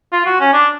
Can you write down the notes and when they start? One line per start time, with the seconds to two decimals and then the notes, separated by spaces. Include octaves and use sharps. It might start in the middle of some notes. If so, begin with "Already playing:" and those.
0.13 F4
0.26 F#4
0.40 C#4
0.53 D4